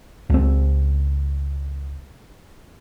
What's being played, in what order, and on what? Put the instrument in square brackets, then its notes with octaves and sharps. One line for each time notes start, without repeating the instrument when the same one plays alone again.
[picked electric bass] C#2 C4